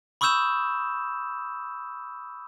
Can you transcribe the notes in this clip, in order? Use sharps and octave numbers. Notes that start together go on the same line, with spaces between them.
B5 C#6 D#6 E6 G6 E7